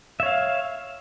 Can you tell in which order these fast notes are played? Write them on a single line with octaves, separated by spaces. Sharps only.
E5 C#5 F5